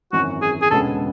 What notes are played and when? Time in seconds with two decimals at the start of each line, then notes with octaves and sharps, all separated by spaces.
0.13 G#1 F#2 E3 F#4
0.42 G#4
0.62 G#4
0.71 E1 D2 C#3 G#3 B3 A4